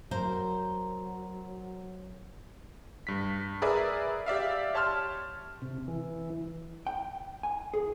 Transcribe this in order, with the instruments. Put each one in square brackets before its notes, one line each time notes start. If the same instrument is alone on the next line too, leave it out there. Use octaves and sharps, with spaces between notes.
[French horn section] F#3 [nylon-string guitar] A#4 C5
[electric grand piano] G2 B6
G#4 A#4 B4 D5 E5
G4 D5 E5 F5
G4 C#5 A5 C6 F6
[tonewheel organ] C3
E3
[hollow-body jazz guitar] G5
G#5
G#4